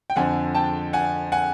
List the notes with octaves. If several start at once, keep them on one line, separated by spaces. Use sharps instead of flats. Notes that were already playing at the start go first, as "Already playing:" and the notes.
G5
F2 D3 F3 F#5 G#5
G5 A5
F#5 G#5
F#5 G#5